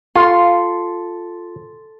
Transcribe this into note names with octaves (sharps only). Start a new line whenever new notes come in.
F4 A4 C6